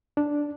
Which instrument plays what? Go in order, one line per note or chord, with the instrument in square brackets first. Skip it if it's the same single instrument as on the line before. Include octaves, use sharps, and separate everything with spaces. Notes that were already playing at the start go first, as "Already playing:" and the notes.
[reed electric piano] D4